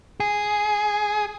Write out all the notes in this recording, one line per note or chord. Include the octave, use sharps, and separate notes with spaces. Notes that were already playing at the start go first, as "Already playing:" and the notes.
G#4